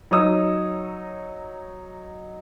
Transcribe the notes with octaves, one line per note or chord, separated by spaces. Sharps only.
F#3 D#4 C#5 D#6 E6